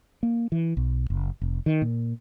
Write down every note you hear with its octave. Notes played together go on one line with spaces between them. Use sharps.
A#3
E3
B1
F#1
F1
D#3
A#2